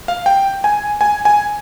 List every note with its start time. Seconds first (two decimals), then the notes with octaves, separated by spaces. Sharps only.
0.08 F5
0.26 G5
0.64 G#5
1.01 G#5
1.25 G#5